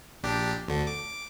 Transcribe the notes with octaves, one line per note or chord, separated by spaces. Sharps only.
A#1 D4 G4
D2 D3
D6